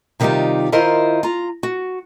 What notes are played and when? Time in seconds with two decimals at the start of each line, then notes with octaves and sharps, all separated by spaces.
0.20 C3 D#3 G3 D#4 F4 G4
0.72 D#3 E4 F4 A#4 C5 D#5
1.23 F4 A#5
1.63 F#4